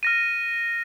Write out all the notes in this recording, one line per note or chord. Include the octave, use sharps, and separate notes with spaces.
F6 A#6 D#7